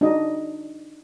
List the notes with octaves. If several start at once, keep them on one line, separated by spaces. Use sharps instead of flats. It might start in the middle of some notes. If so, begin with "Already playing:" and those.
D4 D#4 F#4 G#4 D#5